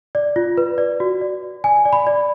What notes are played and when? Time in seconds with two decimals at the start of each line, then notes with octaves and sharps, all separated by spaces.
0.15 D5
0.36 F4
0.57 B4
0.78 D5
1.00 F#4
1.21 D5
1.43 D5
1.64 D5 G#5
1.85 D5
1.93 B5
2.07 D5